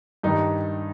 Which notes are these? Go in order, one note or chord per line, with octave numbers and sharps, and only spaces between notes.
G2 D#3 G3 D#4